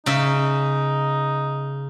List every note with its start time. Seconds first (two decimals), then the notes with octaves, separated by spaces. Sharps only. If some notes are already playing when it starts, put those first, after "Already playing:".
0.06 C#3 D#4 E5